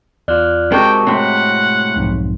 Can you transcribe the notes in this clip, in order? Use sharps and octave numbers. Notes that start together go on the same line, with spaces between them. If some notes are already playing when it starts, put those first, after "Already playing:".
E2 F4 D5 F6 F#6
C3 G#3 F#4 A#4 G5 A5 C#6
A2 C3 C#5 F#5 C6 B6
B1 F2 G#2